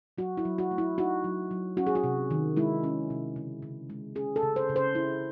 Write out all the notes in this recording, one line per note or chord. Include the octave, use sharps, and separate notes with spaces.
F#3 F#4
E4
F#3
F#4
A3
E4
D#4 F#4
F#3
F#3
C#4 F#4
G#4
F#4
C3
D#3
G#3 E4
C#4
C3
C#3
C#3
G#3
C#4 G#4
A4
C#3
C5
C#3
C5
E4